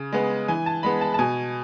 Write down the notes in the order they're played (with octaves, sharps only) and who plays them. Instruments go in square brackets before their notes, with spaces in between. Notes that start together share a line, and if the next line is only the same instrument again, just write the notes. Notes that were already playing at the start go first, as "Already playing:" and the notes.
Already playing: [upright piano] C#3
G#3 B3
E3 G#5
A5
G#3 B3 B5
A5
A5
B2 G#5